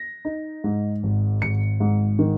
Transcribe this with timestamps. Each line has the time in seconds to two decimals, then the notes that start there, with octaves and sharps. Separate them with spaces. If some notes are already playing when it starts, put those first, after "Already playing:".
Already playing: A#6
0.25 D#4
0.64 G#2
1.03 G#1
1.42 G#1 C#7
1.80 G#2
2.19 D#3